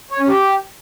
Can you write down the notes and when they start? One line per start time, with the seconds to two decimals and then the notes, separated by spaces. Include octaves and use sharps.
0.11 C#5
0.19 C#4
0.28 G4